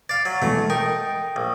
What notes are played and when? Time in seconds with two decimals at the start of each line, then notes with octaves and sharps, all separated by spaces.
0.09 D5 F5 A6
0.25 F#3
0.42 B2 E3 G#3 A3
0.70 D#4 A#4 G5
1.36 A#1